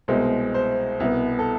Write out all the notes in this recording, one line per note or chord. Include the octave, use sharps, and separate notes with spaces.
C2 B2 G#3 C5
C5
C2 B2 B3
A4